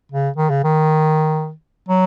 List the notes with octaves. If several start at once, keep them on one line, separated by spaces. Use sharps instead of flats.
C#3
D#3
C#3
D#3
F#3